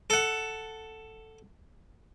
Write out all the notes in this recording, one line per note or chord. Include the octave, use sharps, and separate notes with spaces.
A4 F#5